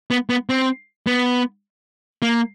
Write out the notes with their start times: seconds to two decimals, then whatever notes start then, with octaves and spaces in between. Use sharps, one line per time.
0.11 B3
0.30 B3
0.49 C4
1.07 B3
2.22 A#3